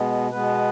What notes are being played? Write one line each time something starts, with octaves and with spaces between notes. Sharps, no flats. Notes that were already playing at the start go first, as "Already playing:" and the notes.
Already playing: B2 G#3 B3
B2 G#3 B3 B4